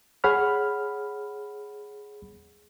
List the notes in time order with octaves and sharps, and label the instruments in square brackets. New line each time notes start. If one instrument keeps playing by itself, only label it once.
[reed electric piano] G#4 C#5 F#5 B5 F6